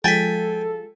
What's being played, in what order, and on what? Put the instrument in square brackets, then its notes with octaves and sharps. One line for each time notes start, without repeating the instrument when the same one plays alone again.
[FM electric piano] F3 G#3 [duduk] A4 [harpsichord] G5 G#5 [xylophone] A6 B6